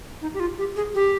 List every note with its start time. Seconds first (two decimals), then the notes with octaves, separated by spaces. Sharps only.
0.22 D#4
0.34 G4
0.40 F4
0.58 G4
0.76 G#4
0.95 G4